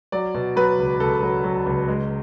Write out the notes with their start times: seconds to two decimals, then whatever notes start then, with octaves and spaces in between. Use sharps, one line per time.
0.12 F#3 D5
0.34 B2
0.56 F#3 B4
0.78 C#2
1.00 C#2 A4
1.22 F#3
1.44 F#3
1.66 C#2
1.88 G#3